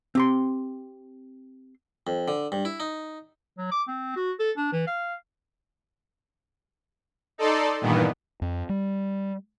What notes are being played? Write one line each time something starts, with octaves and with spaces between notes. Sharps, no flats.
C4 G4 C6
F2
D3
G2
E4
D#4
F#3
D6
C4
F#4
A4
D4
E3
F5
D#4 A4 D5 C6
G2 A#2 D#3 E3 B3
F2
G3